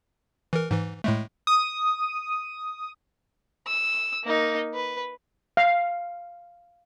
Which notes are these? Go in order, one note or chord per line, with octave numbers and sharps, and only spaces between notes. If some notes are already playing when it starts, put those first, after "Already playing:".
E3 A#4
G#2 E3
A2 G#3 A3
D#6
E6
A#3 D#4
B4
F5